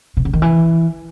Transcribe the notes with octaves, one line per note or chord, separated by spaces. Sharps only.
B2
C#3
D#3
E3